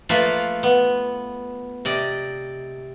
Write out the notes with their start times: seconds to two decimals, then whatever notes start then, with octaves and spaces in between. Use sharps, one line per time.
0.09 F3 A3 A#3 F4 A4 B4
0.63 B3
1.85 C3 D5 D#5